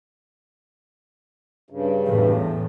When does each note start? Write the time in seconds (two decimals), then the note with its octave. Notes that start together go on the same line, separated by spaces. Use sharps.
1.70 G2 C#3
2.07 E2 A2